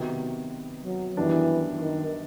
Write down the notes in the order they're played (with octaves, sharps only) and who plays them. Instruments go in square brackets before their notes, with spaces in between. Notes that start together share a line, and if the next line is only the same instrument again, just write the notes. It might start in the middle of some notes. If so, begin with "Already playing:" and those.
Already playing: [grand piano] C3 D#3 F#3 B3 D#4
[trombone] F#3
[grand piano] F#2 D#3 G3 B3 D4 [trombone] E3
[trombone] D#3